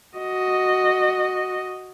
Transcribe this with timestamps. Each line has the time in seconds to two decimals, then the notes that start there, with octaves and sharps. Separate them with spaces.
0.18 F#4 D#5